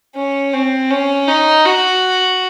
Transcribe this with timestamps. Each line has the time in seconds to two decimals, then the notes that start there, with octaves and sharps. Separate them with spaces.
0.16 C#4
0.53 C4
0.91 C#4
1.28 D#4
1.66 F#4